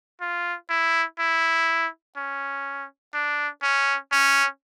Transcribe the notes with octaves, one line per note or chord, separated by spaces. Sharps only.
F4
E4
E4
C#4
D4
C#4
C#4